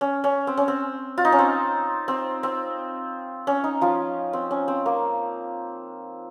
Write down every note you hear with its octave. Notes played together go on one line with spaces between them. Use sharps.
C#4
C#4
C4
C#4
C4
F4
D#4
C#4
C4
C4
C4
C#4
D#4
F3 F4
C4
C#4
C4
A#3